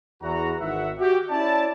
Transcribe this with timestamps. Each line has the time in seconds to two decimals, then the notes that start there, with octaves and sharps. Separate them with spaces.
0.22 E2 F#4 A#5
0.60 G#1 E5 F#5
0.99 F#4 G4
1.30 C#4 E4 D5 A5